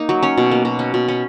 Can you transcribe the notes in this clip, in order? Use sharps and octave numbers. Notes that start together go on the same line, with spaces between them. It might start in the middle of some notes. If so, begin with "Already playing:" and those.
Already playing: A#3 D#4
F#3
C#4 C#5
B2
A#3
B2
C#4
B2
C#4